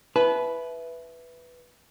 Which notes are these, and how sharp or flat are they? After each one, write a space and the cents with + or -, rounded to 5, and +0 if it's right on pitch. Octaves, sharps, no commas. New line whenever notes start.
E4 +0 B4 +0 A5 -45